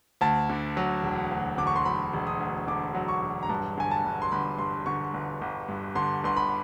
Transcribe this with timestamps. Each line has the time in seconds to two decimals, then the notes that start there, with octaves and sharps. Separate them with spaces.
0.21 D2 A5
0.49 D3
0.77 F#3
1.03 E1
1.31 D2
1.58 D3 D6
1.67 C#6
1.76 C6
1.85 F#3 B5
2.14 E1
2.27 D#6
2.40 D2
2.68 D3 D6
2.95 F#3
3.08 C#6
3.23 E1
3.43 A#5
3.49 G2 A5
3.77 D3 G#5
3.91 A5
4.04 G1
4.22 C6
4.32 G1 B5
4.58 G2 C6
4.86 D3 C#6
5.14 G1
5.41 G1
5.68 G2
5.95 D3 C6
6.24 G1 C6
6.37 B5